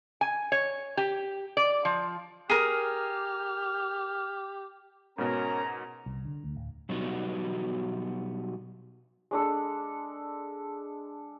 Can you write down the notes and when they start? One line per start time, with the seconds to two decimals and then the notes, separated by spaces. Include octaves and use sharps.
0.21 G#5
0.52 C#5
0.97 G4
1.57 D5
1.85 F3
2.50 G4 G#4 A#4 F6
5.18 G#2 B2 C#4 A#4 A#5
6.06 C2
6.25 D3
6.44 D2
6.56 D1
6.89 B2 F#3 G3 B3 D#4 F#4
9.31 G#3 D4 A4